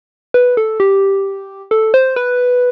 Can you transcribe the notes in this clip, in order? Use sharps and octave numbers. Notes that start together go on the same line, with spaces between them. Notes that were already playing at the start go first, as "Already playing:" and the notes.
B4
A4
G4
A4
C5
B4